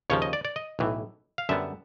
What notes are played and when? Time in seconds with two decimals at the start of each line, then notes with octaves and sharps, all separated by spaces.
0.10 D#2 C#3 F3 C#5
0.22 D#5
0.33 D5
0.45 D5
0.56 D#5
0.79 B1 A2 E3
1.38 F5
1.49 F#2 D3 G3 B3 E5